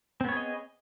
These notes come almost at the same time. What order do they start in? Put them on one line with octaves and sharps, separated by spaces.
C4 B3 C#5 G#4 D#5